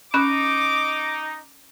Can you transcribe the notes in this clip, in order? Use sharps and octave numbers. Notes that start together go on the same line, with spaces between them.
C#4 D#4 B5 D6 F#6